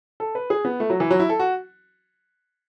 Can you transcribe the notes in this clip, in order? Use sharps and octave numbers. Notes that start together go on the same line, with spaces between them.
A4
B4
G#4
B3
A3
F#3
E3
F#3
E4
A4
F#4